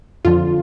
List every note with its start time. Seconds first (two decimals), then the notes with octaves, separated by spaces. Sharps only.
0.25 F2 D3 F3 F4